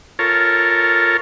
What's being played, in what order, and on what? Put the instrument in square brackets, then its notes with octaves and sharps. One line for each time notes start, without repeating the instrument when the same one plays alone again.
[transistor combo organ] F4 A4 A#4 C#5